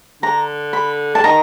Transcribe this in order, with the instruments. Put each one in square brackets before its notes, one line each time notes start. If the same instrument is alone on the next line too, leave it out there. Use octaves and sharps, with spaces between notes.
[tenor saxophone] D3 [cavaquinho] A#5
[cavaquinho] B5
[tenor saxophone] D3 [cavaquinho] A5
[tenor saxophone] D#3 [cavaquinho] A#5